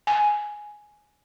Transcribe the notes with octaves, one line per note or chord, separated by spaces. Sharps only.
G#5